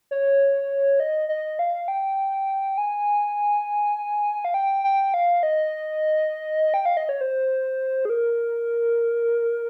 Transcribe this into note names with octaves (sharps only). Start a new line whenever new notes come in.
C#5
D#5
D#5
F5
G5
G#5
F5
G5
G5
F5
D#5
G5
F5
D#5
C#5
C5
G#4
A#4